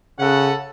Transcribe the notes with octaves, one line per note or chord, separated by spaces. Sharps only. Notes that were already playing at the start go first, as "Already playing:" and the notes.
C#3 C#4 A4 F#5